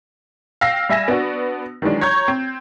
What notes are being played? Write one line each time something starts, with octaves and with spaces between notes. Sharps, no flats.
F5 G5 E6 A#6 C7
G3 E5 G#5 A#6 E7
B3 D4 F#4
D#3 E3 F#3 G#3 D4
C#5 A#5 C#6 G6 G#6
C4